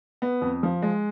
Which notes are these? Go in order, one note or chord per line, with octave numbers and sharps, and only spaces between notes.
B3
F2
F3
G#3